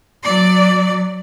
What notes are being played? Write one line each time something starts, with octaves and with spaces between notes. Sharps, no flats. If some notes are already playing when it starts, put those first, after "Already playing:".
F#3 D5